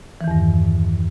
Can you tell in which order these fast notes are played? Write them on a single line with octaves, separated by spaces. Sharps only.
E3 D#3 E2 G2